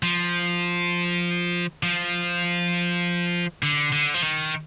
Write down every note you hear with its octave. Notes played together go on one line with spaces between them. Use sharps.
F3
F3
D3
D3
F3
D#3